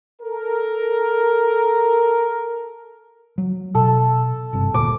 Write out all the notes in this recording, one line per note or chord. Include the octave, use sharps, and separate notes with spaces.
A4 A#4
F#3
B2 A4
G1 G2 C3
D#1 D2 A#2 D6